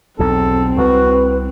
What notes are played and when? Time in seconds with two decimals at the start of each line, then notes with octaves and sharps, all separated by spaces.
0.19 B1 E2 C4 A4
0.78 C2 F#4 B4